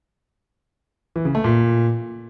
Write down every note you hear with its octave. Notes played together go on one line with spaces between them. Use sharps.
E3
C#3
A3
A#2